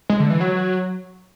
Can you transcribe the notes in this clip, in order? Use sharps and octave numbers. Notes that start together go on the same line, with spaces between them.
G#3
D3
E3
F#3